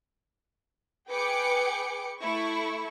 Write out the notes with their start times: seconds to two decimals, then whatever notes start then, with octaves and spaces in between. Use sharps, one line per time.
1.09 G#4 B4 G5 D6 C#7
2.21 A3 E4 C#6